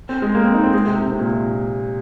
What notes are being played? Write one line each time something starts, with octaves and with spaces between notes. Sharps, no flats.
C4
G#3
A#3
C4
D#4
C4
G#3
C3
C3
C3
A#2
A#2